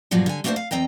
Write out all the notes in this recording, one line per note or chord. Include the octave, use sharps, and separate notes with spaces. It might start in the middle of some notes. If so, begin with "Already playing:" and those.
G2 A#2 F3 F#3 G#4
D3 G#5
A3 A#3 D4 F4 F#4 C5
F5
E2 C4 D#5 G5 A#5